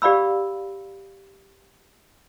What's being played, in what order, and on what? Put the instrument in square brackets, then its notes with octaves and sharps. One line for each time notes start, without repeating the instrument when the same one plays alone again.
[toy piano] G4 D5 F5 B5 E6